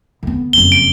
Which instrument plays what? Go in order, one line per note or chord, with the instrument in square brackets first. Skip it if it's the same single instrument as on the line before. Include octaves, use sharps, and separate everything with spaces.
[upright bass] D3 B3
[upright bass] F#1 F2 [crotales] G7
[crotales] D7